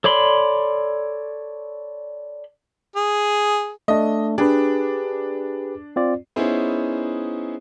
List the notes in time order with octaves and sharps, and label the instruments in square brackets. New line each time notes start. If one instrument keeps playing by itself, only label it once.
[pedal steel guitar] A4 C#5 D5 B5 C6
[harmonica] G#4
[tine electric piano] A3 D4 [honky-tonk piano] D#5
[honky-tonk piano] D4 [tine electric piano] G4 G#4 B4
[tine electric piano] C4 F4 D5
[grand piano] B3 C#4 D#4 E4 G#4 C5